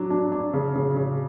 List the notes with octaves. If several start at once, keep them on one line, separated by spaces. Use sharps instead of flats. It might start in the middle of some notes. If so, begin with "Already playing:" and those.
Already playing: F#3 D4
D4
D4
C#3
C#3
C#3